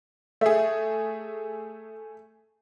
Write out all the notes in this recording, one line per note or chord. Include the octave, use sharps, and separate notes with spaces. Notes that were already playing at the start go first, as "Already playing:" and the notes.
A3 G#4 E5